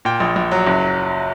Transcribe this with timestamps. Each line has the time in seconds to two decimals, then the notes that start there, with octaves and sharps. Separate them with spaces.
0.05 A#2 G5
0.20 A#1
0.36 A#1
0.52 F#3
0.67 F#1